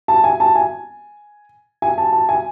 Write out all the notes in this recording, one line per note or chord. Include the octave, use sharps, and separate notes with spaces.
A5
G#5
A5
G#5
G#5
A5
A5
G#5